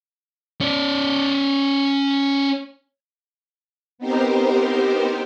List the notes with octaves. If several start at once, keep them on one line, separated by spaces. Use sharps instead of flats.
C#4 D5
B3 C4 D#4 G4 A#4 C5